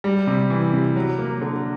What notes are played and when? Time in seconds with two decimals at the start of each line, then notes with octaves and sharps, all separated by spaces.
0.04 G3
0.27 C3
0.50 E3
0.73 C3
0.96 F#3
1.19 A#3
1.42 D3